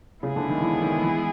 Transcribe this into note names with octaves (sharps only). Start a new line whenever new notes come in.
C#3 G#3 B3 E4 G#4
D3
D#3
E3
D#3
E3